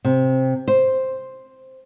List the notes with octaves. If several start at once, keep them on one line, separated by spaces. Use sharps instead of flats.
C3
C5